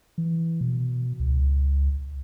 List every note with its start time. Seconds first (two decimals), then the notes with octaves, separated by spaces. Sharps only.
0.18 E3
0.61 B2
1.20 C#2